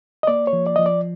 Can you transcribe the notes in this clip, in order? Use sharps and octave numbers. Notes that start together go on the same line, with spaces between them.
D#5
A#3 D5
C#5
F3
D5
F3 D#5
D5